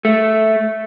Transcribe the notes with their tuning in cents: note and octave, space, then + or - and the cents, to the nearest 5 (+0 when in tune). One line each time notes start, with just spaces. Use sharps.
A3 -5